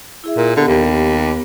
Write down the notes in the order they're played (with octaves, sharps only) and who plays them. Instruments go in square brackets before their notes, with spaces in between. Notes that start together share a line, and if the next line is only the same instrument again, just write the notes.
[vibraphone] E4 G#4 E5
[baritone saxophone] A#2
[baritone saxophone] D3 [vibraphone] B3 G4
[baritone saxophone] D#2